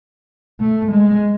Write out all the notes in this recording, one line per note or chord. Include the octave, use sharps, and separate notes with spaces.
A3
G#3